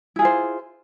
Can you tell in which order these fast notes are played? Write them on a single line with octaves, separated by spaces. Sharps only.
E4 G#4 F4 C5